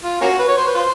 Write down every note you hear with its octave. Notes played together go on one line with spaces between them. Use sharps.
F4
A#3 C#4 F#4
B4
C#5
C5
B4
F4 C5